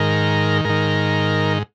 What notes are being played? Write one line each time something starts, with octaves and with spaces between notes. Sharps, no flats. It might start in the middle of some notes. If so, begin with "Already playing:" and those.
Already playing: G#2 D#3 A#4
G#2 D#3 A#4